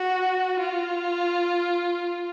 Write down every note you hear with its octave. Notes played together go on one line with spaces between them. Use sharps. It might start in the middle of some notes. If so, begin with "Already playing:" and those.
Already playing: F#4
F4